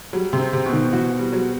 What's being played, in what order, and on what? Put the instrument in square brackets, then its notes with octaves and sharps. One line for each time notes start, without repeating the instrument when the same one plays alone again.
[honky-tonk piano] F#3 [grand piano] G3
[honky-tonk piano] C3
[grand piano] C4
[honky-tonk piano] C3
[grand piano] B2
[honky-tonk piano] D#3
[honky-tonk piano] E3 [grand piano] F#4
[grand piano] G3
[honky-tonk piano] F#3